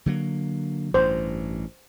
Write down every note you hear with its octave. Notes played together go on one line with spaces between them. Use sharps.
D3 F#3 A#3
A1 G2 C5